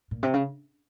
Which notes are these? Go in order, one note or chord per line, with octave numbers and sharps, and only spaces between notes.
A#2
C3
C#3